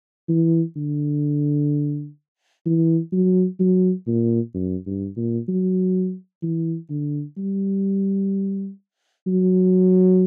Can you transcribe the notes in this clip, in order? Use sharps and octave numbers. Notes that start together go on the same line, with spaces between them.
E3
D3
E3
F#3
F#3
A#2
F#2
G2
A#2
F#3
E3
D3
G3
F#3